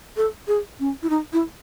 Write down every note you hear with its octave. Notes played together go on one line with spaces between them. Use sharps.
A4
G#4
C#4
E4
D#4
E4